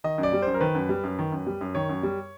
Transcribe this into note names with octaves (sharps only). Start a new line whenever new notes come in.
D#3 D#5
F#2
D5
G3
F#2 C5
A#4
D#3 B4
F#2
G3
F#2
D#3
F#2
G3
F#2
D#3 C#5
F#2
G3